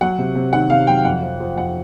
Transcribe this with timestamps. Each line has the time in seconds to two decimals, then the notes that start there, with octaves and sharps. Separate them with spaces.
0.01 F#3 F#5
0.18 C3
0.35 C3
0.52 D#3 F#5
0.70 C3 F5
0.87 F#3 G5
1.05 F2 F#5
1.22 F3
1.40 F3
1.56 F2 F#5